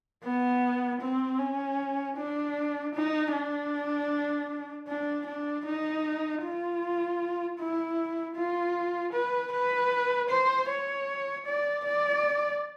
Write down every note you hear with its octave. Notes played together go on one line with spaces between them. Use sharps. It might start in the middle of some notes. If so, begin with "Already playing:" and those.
B3
C4
C#4
D4
D#4
D4
D4
D4
D#4
F4
E4
F4
B4
B4
C5
C#5
D5
D5